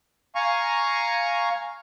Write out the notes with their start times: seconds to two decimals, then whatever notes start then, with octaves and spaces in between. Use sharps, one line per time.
0.35 F5 G#5 A#5 C#6